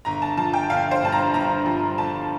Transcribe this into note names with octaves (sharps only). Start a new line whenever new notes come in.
G1 A#5
A5
F3 A5
G5
G1 F5
C5
G2 A5
A#5
G1 A#5
F3
G1 A5